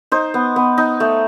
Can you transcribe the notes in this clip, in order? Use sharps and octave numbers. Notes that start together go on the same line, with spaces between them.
D#4 C5
B3
B3
D#4
A3